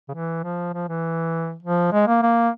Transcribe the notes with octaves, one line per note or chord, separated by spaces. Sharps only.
C#3
E3
F3
F3
E3
F3
G#3
A#3
A#3